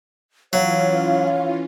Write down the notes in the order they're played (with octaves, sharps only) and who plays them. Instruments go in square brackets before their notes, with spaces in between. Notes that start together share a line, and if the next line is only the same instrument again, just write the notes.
[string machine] E3 C#4 F4 [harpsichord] F#3 [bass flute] C#5 [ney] F5